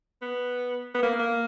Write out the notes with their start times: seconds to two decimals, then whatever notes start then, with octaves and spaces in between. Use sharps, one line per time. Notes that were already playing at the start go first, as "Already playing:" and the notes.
0.22 B3
0.95 B3
1.03 A#3
1.19 A#3